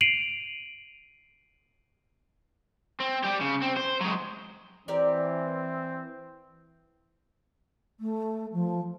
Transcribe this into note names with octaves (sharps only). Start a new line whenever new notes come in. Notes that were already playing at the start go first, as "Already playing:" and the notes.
C7 D7 D#7 F7 F#7
C4
G3 G4
C#3
C4
C5
F#3 G#3
E3 C4 G4 A#4 D5
A3
F3